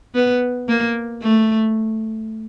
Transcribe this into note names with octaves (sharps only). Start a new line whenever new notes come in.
B3
A#3
A3